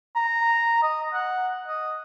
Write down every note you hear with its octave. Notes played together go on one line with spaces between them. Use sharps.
A#5
D#5
F#5
D#5